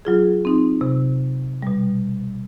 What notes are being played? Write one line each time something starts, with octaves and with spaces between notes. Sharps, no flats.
F#3 F4 G#4
C4 D#4
C3
B2 G3